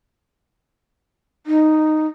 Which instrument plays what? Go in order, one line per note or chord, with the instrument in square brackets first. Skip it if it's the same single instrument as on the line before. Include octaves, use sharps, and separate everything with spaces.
[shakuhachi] D#4